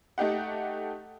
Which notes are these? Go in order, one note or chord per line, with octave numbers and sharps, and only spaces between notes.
A3 D#4 G4 F#5